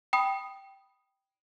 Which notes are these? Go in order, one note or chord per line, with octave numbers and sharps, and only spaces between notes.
G5 B5 D#6